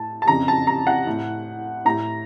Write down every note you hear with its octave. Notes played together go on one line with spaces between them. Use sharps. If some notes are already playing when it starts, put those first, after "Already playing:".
Already playing: A2 A5
A5
F2 C#3 A#5
A5
A#5
F#5
A2
A2 A#5